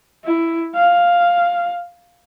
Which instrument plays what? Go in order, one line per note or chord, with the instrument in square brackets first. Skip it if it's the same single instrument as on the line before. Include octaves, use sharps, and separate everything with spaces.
[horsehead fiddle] E4
F5